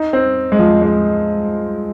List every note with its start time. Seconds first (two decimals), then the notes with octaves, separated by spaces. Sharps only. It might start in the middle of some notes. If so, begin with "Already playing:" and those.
Already playing: D#4
0.13 C4
0.52 G#3
0.59 F3
0.82 G#3